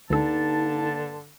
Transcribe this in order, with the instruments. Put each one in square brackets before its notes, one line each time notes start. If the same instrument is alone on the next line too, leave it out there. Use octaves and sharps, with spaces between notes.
[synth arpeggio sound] D2 A4 [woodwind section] G2 A#3 A5 [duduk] D3 [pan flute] D#4